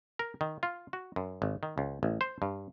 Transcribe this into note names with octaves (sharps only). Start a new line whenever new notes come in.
A#4
D#3
F4
F#4
F#2
G#1
D#3
C#2
A1
C5
G2